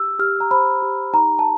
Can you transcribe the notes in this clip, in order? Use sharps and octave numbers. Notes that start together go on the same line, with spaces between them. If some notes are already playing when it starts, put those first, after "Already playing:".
Already playing: G4 E6
G4 F6
A#5
C5 B5
G4
D#4 A#5
A5